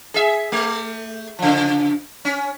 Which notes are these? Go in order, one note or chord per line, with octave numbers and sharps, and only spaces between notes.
G#4 E5
A3
C#3 F3
C#4